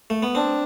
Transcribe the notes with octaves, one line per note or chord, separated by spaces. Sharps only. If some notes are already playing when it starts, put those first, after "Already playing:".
A3
B3
C4 D4